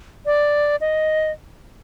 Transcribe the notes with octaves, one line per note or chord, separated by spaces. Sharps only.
D5
D#5